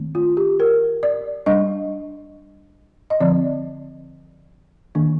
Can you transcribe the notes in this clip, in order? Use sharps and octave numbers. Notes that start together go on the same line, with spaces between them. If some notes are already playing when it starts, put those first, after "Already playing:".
Already playing: D#3 A3 C4
F4
G4
A#4
D5
G3 D4 D#5
D#5
D3 F3 C4 D5
D#3 A#3 D4